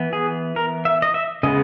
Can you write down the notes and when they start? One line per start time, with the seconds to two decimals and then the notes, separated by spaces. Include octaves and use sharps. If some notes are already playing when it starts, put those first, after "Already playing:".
Already playing: E3 B3
0.13 G#4
0.56 A#4
0.85 E5
1.02 D#5
1.14 E5
1.43 C#3 G#3 B3 D#5